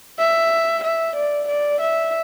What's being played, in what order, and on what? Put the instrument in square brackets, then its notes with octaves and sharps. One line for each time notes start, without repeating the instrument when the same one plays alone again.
[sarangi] E5
E5
D5
D5
E5